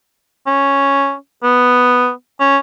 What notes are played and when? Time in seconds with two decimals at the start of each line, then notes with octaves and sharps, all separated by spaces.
0.47 C#4
1.43 B3
2.40 C#4